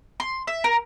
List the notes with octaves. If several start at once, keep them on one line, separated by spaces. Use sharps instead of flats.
C6
E5
A#4